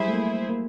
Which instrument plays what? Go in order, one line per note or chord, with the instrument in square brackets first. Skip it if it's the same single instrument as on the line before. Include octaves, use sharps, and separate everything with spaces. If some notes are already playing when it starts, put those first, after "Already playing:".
Already playing: [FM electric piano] F#3 G3 [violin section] E4 G#4 C5 E5
[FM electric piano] A3
A#3
A#3